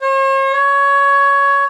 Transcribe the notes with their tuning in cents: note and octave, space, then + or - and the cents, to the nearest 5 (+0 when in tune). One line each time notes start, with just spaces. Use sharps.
C#5 -45
C#5 +15